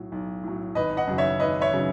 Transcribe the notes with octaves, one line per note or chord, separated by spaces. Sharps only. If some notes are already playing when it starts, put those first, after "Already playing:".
Already playing: B1 A2 F#3
B1
A2 F#3
G#1 B4 D#5
D#5 F#5
F#2 C#3 F#3
C#5 E5
G#1 B4 D#5
C#5 E5
C#3 F#3